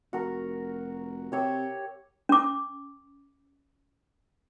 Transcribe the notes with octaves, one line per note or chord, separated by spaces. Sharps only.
F1 F#4 A#4 C#6
C3 G4 C#5 E5
C#4 D6